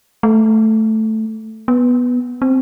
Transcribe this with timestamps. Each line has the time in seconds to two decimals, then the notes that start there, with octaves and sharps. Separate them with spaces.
0.23 A3
1.68 B3
2.42 C4